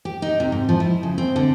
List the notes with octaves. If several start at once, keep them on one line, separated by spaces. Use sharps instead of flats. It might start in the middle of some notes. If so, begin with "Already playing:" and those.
G4
D#4
C3
G#2
F3
E4
C#3
C4
D3